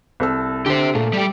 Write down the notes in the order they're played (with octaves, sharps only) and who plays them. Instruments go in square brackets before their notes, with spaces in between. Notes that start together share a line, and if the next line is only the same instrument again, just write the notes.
[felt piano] C2 A4 E6
[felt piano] D3 [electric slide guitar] G4 C5
[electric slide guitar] A#2 [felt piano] A3
[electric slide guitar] G3 G4